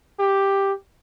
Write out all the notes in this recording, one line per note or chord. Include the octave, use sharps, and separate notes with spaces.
G4